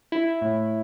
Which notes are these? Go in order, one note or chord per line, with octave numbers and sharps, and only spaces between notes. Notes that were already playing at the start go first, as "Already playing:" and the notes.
E4
A2